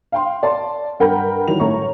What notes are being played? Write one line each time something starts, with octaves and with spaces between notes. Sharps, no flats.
F5 G5 C6
D5 A5 C6
G2 A#4 F#5 G5 B5 G6
D#3 E3 F#3 G3 F7
A1 A3 C#5 A#5 C#6